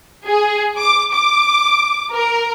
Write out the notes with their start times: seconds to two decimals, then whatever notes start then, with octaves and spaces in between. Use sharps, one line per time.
0.24 G#4
0.77 D6
1.11 D6
2.12 A#4